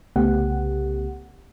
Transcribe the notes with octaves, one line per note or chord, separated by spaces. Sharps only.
C2 C#3 A3 B3 G4 F#5